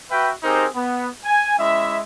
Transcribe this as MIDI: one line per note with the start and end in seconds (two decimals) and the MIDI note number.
0.11 0.31 66
0.11 0.31 71
0.11 0.31 76
0.11 0.31 79
0.43 0.67 60
0.43 0.67 63
0.43 0.67 67
0.43 0.67 68
0.43 0.67 70
0.43 0.67 72
0.75 1.07 59
1.25 1.54 80
1.59 1.99 56
1.59 1.99 61
1.59 1.99 64
1.59 1.99 76